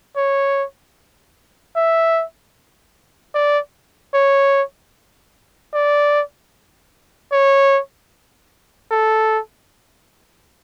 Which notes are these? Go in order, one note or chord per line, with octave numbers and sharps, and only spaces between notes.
C#5
E5
D5
C#5
D5
C#5
A4